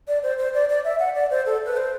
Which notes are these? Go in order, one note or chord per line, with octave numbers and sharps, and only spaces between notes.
D5
C5
C5
D5
D5
E5
F#5
D5
C5
A4
B4
C5